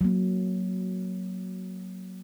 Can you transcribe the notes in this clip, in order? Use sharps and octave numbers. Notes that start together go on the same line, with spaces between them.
F#3 A#3